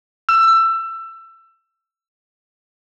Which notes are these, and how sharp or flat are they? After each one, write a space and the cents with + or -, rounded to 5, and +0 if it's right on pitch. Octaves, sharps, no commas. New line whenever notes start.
E6 +20